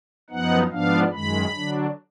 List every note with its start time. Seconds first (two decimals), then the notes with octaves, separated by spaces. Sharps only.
0.30 F#2 F3 B3 D#4 F#5
0.71 G#2 F3 B3 D4 F5
1.12 F#2 D#3 G#3 B5
1.54 D3 F#3 D4